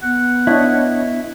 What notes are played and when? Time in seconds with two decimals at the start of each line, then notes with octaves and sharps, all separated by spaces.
0.03 B3 F#5
0.47 D4 E4 C#5 D#5